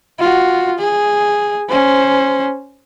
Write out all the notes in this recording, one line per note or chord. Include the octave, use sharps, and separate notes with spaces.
F4 F#4
G#4
C#4 C5